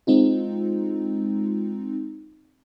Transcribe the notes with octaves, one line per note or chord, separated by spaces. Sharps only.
G#3 C4 D#4 F4